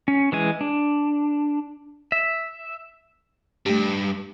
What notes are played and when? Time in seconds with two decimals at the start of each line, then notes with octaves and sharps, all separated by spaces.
0.08 C#4
0.32 E3 G#3 G#5
0.61 D4
2.12 E5
3.66 G2 A3 G4